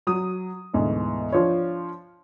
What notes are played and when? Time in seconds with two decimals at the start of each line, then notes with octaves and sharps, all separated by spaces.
0.07 F#3 D#6
0.74 D2 G#2 B2 E3
1.32 F3 D4 F4 C#5